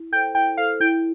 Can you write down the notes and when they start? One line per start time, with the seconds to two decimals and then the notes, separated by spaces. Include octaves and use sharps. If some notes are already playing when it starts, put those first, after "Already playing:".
Already playing: E4
0.12 A4 G5
0.16 C5
0.35 E4 G5
0.58 A4 C5 F5
0.80 E4 G5